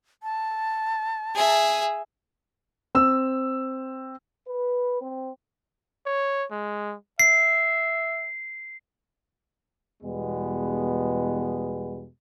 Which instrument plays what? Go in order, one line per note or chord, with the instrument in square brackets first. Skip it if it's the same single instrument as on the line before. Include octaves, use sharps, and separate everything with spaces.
[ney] A5
[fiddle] G#4 E5
[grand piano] C4 E6
[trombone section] B4
C4
[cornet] C#5
G#3
[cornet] E5 [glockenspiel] C7
[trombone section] E2 B2 G3 G#3 B3